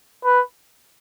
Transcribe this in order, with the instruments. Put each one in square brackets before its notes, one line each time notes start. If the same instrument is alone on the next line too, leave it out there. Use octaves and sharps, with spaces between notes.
[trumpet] B4